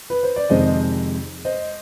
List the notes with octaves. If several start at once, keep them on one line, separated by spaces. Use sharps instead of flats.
B4
C5
D5
F2 C3 D#3 G#3 C5 D#5
C5 D#5